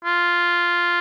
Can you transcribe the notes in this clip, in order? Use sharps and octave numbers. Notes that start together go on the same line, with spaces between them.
F4